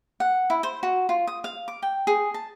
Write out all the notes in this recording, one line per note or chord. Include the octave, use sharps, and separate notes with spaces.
F#5
E4
C5
F#4
F4
D#6
F5
D6
G5
G#4
A5